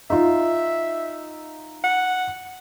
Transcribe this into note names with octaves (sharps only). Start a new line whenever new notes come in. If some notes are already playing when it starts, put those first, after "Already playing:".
D#4 F4 E5
F#5